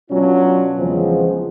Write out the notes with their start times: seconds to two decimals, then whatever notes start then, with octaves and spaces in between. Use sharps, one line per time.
0.11 B2 F#3 C#4 D4 F4
0.78 E2 C#3 F3 G#3 B3 C4